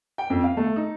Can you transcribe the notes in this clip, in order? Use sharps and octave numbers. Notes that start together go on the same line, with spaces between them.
G5
F2
F5
A3
D#4